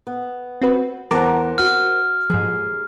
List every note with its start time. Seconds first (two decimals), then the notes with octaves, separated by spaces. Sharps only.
0.07 B3
0.61 C4 F#4 B4
1.11 E2 A#4 C5 F#5 A5 A#5 D6
1.58 F#4 F6
2.30 D#2 G#2 F3 G#4